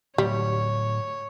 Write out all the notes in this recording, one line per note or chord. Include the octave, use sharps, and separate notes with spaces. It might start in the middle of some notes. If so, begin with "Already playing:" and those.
A2 D3 F#3 G3 C#5